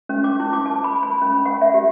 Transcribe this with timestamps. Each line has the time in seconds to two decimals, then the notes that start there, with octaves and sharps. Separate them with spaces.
0.09 C#4
0.24 D6
0.40 E4
0.53 D6
0.66 A5
0.84 B5
1.03 B5
1.22 C#4
1.45 F#5
1.61 E5
1.74 G4